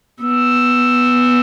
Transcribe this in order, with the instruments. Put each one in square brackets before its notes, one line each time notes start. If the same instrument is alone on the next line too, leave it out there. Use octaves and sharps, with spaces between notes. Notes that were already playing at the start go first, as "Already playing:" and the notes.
[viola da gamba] B3 [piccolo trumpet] E6